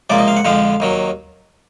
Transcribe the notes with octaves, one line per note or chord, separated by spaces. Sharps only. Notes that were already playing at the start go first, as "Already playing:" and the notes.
C#2 C3 F3 A#3 D5
D#5
F5
F#5
F2 D3 F3 G#3 F5
D#2 D#3 F#3